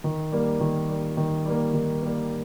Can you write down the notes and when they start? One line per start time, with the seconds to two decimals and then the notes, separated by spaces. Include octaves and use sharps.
0.04 D#3
0.32 G3 A#3
0.60 D#3
0.89 G3 A#3
1.17 D#3
1.46 G3 A#3
1.74 D#3
2.02 G3 A#3